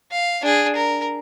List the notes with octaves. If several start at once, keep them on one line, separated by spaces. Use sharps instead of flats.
F5
D4 G#4
A#4